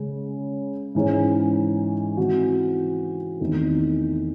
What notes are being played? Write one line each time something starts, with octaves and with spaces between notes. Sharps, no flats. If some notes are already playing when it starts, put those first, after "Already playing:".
Already playing: C#3 G#3 C#4
G#2 E3 G#3 C#4
E3 C4 F#4
E2 D#3 A3 C4 D#4